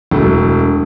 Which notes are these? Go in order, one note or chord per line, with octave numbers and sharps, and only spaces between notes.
E1 A3